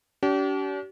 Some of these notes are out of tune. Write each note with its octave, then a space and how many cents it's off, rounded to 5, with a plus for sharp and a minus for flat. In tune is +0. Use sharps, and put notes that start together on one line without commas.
D4 -45 G4 -40